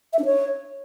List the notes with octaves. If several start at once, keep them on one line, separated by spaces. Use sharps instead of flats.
E5
D4
C#5